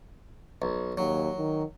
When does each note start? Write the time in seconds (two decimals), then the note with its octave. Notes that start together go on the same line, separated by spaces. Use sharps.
0.62 B1
0.97 D#2 F#3
1.38 D#3